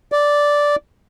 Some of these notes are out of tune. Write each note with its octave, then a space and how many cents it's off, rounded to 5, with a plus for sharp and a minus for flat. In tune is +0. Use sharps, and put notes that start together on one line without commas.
D5 -5